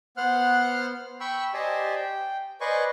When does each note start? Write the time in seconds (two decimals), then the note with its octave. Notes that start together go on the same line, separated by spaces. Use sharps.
0.17 B3 C5 F#5 F6 F#6
1.20 G5 B5 C#6 E6
1.54 G4 C5 D5 D#5 G#5 A5
1.96 G5
2.61 B4 C5 D5 D#5 G#5 C#6